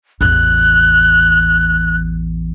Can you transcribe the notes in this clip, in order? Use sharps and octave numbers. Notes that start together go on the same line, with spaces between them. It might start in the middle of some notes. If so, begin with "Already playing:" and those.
A1 E2 F#6